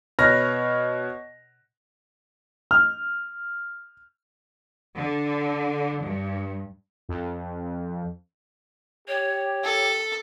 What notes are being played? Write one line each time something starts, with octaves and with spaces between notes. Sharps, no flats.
B2 B4 C#5 F6 A#6
F6
D3
G2
F2
G4 C#5
A4